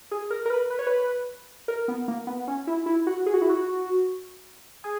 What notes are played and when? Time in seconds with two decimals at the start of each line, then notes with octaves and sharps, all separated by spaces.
0.11 G#4
0.30 A#4
0.46 A#4
0.50 B4
0.70 B4
0.79 C#5
0.87 B4
1.68 A#4
1.88 B3
2.08 A#3
2.27 B3
2.48 C#4
2.67 E4
2.86 E4
3.07 F#4
3.26 G#4
3.34 F#4
3.42 E4
3.50 F#4
4.84 G#4